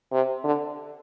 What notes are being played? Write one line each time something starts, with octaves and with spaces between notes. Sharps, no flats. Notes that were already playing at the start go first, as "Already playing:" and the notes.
C3
D3